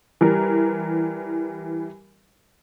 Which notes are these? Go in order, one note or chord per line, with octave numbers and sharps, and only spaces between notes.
E3 G3 A#4